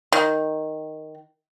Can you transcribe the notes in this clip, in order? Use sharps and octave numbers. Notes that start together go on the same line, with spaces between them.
D#3